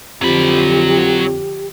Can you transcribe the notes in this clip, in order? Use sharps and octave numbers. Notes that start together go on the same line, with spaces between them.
F2 D3 F3 F#3 G4 B5